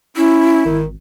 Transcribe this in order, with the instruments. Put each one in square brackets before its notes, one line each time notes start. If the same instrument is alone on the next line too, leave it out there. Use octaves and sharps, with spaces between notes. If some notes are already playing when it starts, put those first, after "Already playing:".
[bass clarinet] C#4 [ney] E4
[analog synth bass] G#1 [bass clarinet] D#3